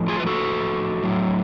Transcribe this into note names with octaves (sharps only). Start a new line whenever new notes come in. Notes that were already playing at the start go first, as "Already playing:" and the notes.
Already playing: A2 F3
F4 G#4
B4
F#4 A4
A2 F#3